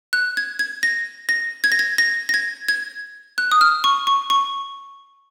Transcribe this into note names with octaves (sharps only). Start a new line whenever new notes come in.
F#6
G#6
G#6
A#6
A#6
G#6
A#6
G#6
A#6
A#6
G#6
G#6
F#6
D#6
F6
C#6
C#6
C#6